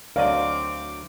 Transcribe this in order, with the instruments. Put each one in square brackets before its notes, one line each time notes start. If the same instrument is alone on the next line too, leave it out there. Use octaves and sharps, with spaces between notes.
[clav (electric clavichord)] D2 F#3 [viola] C4 D6 [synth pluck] A#4 D5 D#5 [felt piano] F5